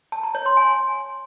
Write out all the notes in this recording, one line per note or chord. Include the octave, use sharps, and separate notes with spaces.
A5
A#5
C#5
C6
G#5